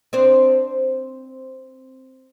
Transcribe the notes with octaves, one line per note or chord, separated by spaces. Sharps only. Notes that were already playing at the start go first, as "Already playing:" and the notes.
C4 D4 C5